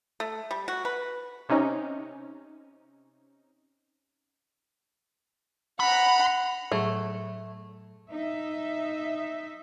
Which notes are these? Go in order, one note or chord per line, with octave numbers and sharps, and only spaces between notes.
A3
G3
F#4
B4
C3 C#4 D#4
F#5 A#5 B5
A2 F#3 A3 G#4
D#4 E5